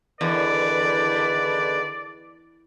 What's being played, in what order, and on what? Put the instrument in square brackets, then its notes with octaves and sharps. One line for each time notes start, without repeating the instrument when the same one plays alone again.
[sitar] E2 [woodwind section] D3 D#3 B4 [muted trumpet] D5